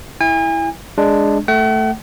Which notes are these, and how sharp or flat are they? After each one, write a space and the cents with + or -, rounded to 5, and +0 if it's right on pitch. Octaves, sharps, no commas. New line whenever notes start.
E4 -5 G#5 -40
G#3 +0 D4 +0
A3 +0 F#5 +45